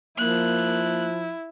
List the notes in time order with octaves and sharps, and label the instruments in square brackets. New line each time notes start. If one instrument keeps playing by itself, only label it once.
[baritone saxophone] F3 [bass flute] A#3 [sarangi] E4 [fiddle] F#6